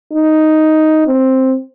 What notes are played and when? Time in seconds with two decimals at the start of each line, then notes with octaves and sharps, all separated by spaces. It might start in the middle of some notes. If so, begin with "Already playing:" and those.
0.12 D#4
1.07 C4